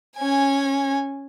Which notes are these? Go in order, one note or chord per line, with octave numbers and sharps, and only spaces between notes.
C#4 G#5